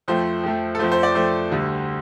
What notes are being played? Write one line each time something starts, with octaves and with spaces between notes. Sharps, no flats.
F2 F3 A3 C5
F2 F3 A3
A4
F2 F3 A3 C5
C5
D5
F2 F3 A3 C5
D2 D3 G3